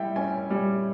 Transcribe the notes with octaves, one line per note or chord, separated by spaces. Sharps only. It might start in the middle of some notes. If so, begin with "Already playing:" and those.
Already playing: G3 E4 G5
C#4 G#5
G3